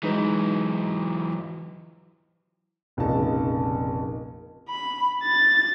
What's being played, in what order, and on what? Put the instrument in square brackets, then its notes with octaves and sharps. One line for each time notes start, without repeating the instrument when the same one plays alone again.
[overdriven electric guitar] E3 F#3 [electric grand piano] G#3 D#4 B4
[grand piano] F1 A#1 C#3 D#4 A5
[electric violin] B5
A6